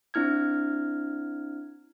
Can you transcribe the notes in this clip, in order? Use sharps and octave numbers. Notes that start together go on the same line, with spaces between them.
C4 D4 E4 F6 G#6